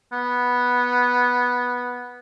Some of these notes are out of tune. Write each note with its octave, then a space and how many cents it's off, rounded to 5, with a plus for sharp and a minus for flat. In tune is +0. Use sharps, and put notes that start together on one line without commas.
B3 -5